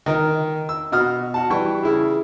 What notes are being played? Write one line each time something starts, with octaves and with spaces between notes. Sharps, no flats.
D#3 A#4 D#5
E6
B2 F#4 D#6 F6
F#4 F#5 A5
E3 G3 G5 C#6
C#3 E4